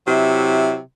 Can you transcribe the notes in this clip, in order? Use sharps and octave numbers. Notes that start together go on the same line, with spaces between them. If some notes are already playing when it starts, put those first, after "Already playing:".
C3 F#3 E4